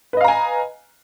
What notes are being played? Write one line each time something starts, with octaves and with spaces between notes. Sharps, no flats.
B4 D#5 F5 G#5 A#5